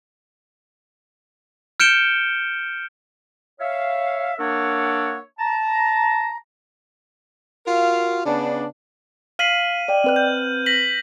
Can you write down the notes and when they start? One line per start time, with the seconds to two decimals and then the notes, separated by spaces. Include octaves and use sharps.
1.80 F6 G6 C#7 D7 E7 G7
3.60 C#5 E5 F5
4.38 A#3 D4 A#4 C#5 E5 F#5
5.39 A5 A#5
7.67 F4 F#4 A#4 F5
8.25 C#3 B3 D4
9.39 F5 F6 B6 C7 D#7 F#7
9.88 D5 D#5 G5
10.04 C4 B4 F#6
10.16 G6
10.66 A#6 B6 F#7